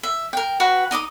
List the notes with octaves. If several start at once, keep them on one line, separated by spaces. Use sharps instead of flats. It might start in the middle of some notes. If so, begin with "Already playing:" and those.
E5
A#4 G5
F#4 B4 F#5
D#4 D#5 D6 D#6